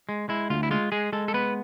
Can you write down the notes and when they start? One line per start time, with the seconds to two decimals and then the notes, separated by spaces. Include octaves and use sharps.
0.09 G#3
0.29 G#3 E4
0.50 D2 F4
0.63 E4
0.71 G#3 F4
0.92 G#3 G#4
1.13 G#3 A4
1.28 A4
1.34 B3 B4